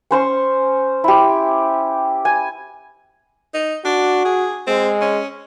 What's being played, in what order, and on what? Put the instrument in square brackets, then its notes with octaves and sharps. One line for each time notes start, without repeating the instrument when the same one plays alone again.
[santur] C#4 C5 C6 C#6
E4 G4
G#5
[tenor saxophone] D#4
[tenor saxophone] D4 [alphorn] F#4
[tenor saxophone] G#4
[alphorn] G#3 [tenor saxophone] C4
[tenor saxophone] C#4